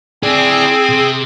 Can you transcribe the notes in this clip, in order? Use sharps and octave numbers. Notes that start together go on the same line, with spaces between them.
C4 E4 G#4 D5
C3